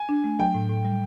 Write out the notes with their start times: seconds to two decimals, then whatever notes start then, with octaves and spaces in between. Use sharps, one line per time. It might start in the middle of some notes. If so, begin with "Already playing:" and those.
Already playing: G#5
0.09 D4
0.24 A3
0.39 F#3 G5
0.54 A2
0.69 A2
0.85 G3